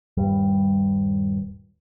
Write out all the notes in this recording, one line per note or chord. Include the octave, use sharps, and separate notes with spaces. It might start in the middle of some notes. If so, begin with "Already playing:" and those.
D#1 G2 G3